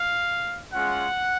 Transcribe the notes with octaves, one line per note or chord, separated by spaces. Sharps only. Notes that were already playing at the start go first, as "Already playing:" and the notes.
Already playing: F5
G#3 C#4 F4 F#5